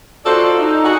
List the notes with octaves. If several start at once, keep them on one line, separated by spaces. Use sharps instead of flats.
D#4 F4 F#4 A4 C5 D5
D#4
F#4 G#4